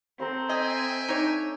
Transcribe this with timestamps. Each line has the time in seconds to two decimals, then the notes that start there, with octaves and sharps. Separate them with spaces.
0.20 C4 A4 A#5 C#6
0.49 D#5 E5 G5 G#5
1.08 D4 D#4 C#5